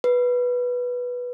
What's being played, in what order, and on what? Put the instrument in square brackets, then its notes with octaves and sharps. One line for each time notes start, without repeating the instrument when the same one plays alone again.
[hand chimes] B4